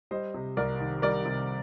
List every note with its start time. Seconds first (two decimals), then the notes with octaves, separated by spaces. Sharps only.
0.11 G3 C5 D#5
0.34 C3
0.57 C2 A#4 D5
0.80 D#3
1.02 G3 A#4 D5
1.25 C3